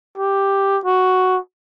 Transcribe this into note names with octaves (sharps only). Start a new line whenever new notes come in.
G4
F#4